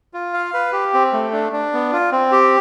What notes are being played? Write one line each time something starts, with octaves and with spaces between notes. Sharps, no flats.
F4
F5
B4
G4
C4
A3
D4
D4
B3
F4
C4
G4